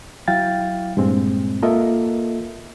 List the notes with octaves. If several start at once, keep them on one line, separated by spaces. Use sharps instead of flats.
F#3 E4 F5 G5 A6
G2 A#2 G#3 C4
A#3 F4 A4 A#4 D#5 E5